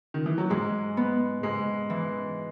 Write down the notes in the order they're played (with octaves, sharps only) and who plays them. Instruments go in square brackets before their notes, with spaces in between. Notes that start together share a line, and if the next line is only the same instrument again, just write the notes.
[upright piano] D#3
E3
F#3
[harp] G#2 [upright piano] G#3
[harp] B3
[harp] G#2 [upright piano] G#3
[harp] E3